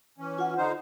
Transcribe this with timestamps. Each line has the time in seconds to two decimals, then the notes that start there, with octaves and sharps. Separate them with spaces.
0.18 E3 C#4
0.38 F4 F#5
0.58 D3 D#4 C5